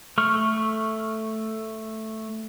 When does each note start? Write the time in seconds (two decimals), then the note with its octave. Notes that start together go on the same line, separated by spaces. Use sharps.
0.18 A3 C#6 F6